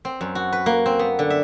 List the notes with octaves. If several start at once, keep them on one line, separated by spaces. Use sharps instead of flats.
C4
F#2
F#4
B4
A#3
C4
B3
D3
E5